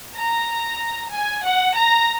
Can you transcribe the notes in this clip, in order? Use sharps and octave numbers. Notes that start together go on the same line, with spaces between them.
A#5
G#5
F#5
A#5